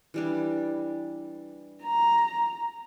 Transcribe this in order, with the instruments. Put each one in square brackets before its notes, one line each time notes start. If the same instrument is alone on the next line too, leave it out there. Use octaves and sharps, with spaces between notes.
[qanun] E3 G3 D4
[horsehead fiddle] A#5